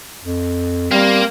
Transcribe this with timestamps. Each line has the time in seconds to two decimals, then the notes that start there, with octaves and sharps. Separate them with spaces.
0.24 F2
0.91 G3 A#3 C4